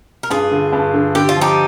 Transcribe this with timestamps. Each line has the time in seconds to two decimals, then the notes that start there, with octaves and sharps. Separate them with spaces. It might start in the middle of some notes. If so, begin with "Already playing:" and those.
0.23 A#4
0.30 G2 F4 G#4
0.51 D3
0.72 G2
0.94 D3
1.15 D3 G4
1.29 F4
1.36 F3
1.41 D#4 G4